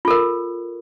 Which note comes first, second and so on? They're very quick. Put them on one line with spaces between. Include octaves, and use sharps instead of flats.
F4 A4 A#4